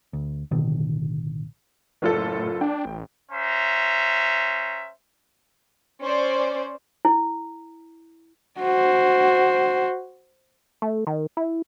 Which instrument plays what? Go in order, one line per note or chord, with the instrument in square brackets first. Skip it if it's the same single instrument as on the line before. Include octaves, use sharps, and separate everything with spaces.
[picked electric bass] D2
A1 B2 D3 D#3
[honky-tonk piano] F#1 F4 A4 [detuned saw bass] A2
[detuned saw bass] D4 [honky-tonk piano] G5
[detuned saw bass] A1
[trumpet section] C#4 C5 E5 A#5
[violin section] C#4 C5 D5
[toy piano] E4
[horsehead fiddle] F#4 C5
[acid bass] A3
D#3
E4